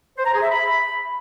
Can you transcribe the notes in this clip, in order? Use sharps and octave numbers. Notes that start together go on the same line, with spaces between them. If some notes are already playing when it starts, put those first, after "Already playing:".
C5
A#5
G#4
E5
B5